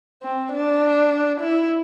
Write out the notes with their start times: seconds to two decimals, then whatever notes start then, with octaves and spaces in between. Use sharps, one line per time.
0.22 C4
0.52 D4
1.40 E4